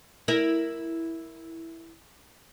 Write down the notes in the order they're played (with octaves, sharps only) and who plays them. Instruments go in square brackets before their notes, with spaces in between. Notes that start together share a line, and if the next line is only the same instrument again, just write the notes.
[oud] E4 A#4